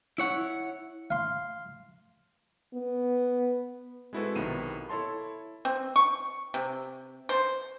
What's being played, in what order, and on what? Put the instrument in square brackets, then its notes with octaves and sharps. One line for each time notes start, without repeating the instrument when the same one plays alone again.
[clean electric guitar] E4 C#5 F#5
[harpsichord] F5 C6
[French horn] B3
[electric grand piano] G#3 C4 E4 F#4 A4 B4
B1 C3 D#3 B3 D#7 E7
E4 A4 C#5 A5 C6
[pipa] C4
C#6
C3
C5